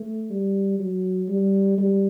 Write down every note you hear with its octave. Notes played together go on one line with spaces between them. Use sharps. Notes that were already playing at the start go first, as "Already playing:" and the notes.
Already playing: A3
G3
F#3
G3
G3